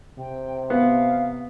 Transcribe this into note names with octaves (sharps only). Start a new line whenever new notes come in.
C3 G5
B3 F5